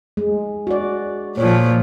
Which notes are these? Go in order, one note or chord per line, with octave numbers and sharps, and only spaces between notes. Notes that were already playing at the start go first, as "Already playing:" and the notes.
G#3
F#4 D5
A#2 F3 C#5